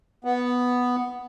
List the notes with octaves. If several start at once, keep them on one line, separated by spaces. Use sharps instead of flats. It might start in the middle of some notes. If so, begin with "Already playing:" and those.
B3